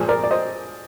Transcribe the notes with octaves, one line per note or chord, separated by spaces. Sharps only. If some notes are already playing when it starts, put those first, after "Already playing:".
Already playing: A#2 F3 G#4 C5
A#4 D5
D5
C5 D#5